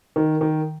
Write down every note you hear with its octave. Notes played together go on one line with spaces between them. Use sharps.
D#3
D#3